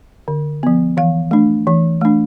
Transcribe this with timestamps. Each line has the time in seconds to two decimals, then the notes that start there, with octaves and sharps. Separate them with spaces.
0.28 D3
0.63 F3 B3
0.97 E3 F5
1.31 A3 D4
1.67 E3
2.01 A3 D4